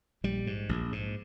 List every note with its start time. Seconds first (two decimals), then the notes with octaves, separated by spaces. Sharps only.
0.24 A#1 G3
0.47 G#2
0.69 A#1
0.92 G#2